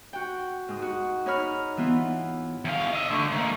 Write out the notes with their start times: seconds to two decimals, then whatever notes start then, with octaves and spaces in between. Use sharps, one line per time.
0.13 F#4 G5
0.68 G#2 D#6
0.82 F#4
1.26 D#4 C#5 B5 F6
1.77 E3 B3 F4
2.65 E2 F5
2.93 D#5 E5
3.10 D3 A3
3.32 G#3 A#3